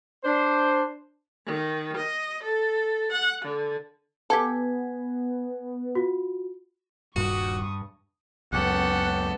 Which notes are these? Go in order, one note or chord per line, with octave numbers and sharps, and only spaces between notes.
D4 C5
D#3
D#5
A4
F#5
D3
B3 G4 A4 G#5 G#6 B6
F4 F#4
D#1 G2 F#4 C#6 D#6
C#2 F#2 B3 C#4 G4 A4 F#5